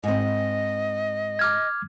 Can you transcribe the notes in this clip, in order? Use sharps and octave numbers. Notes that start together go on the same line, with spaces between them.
G#2 C4 D#5
D6 F6 G#6